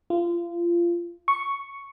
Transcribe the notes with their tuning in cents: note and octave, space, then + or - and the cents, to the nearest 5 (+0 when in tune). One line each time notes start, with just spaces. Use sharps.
F4 -25
C#6 +0